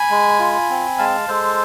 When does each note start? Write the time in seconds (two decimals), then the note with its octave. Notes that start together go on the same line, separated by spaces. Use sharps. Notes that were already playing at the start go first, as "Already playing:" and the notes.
Already playing: G#5 B5
0.11 G#3
0.40 F4
0.70 C4
0.98 G#3 F5 A5
1.28 G#3 A4 C5